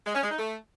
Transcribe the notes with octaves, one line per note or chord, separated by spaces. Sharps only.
G#3
C#4
G#3
D#4
A3